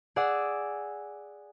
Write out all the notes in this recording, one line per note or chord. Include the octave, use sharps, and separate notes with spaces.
G#4 D5 F#5 D6 E6